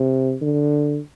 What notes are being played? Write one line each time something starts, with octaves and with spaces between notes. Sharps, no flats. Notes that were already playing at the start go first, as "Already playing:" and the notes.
Already playing: C3
D3